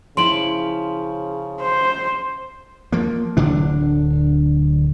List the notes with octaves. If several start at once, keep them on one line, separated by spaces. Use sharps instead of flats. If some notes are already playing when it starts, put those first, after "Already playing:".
C#3 F3 E4 C6 D7 F#7
C5
F3 A#3
D1 D3 D4